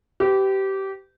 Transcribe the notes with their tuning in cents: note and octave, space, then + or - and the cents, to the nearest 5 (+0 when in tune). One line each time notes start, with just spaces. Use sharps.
G4 -20 B4 +35